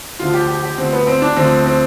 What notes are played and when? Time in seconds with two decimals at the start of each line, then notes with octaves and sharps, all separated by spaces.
0.19 D2 D3 F3 F4
0.34 G4
0.49 G4
0.63 G4
0.78 D2 D3 F3 C4
0.93 B3
1.07 C4
1.22 D4
1.36 D2 D3 F3 C4
1.66 C4